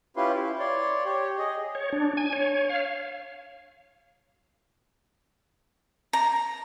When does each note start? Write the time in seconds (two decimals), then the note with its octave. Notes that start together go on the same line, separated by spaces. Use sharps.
0.16 C#4 E4 F4 G4 B4 C6
0.33 E4
0.59 C#5 D5 C6
1.05 G4 C#5
1.39 G#4 D#5
1.75 C#5
1.92 D4
2.17 G#5
2.33 C#5
2.69 F5
6.13 A#5